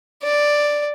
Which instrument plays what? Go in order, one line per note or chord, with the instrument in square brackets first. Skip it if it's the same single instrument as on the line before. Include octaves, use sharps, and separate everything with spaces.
[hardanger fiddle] D5